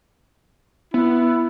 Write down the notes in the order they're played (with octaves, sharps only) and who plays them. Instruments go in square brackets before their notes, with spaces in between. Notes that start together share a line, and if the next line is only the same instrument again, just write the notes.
[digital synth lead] B3 [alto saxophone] E4